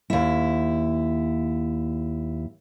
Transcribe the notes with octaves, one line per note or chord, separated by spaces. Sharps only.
D#2 E4